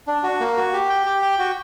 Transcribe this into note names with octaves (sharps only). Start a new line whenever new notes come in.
D4
F#4
A#3
F#4
G4
G5
G4
G5
F#4